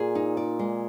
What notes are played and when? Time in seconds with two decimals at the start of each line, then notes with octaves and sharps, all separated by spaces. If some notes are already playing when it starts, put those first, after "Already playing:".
Already playing: A#2 G#4
0.15 D#4
0.37 D5
0.59 G#3